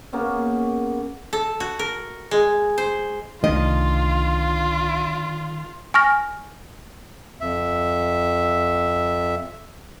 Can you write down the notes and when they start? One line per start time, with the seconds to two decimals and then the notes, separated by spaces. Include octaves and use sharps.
0.13 C#3 A#3 B3 C#4
1.33 A4
1.60 F#4
1.79 A#4
2.31 G#3
2.78 C5
3.44 C2 D3 D#3 A3 F4 D#5
5.94 G#5 C#6 F6 A#6
7.41 F2 E5